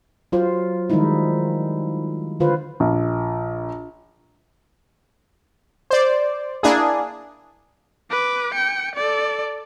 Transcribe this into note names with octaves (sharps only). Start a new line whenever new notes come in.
F#3 F4 C5
D#3 F3 G3 G#3 D#4 E4
D3 F4 B4 C5
A#1
C5 D5
A#3 D4 E4 G#4
B4 D6
G5 C#7
A4 D5